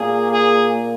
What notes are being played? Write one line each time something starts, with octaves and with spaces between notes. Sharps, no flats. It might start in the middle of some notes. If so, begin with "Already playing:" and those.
Already playing: A#2 A#3 G#4
G#4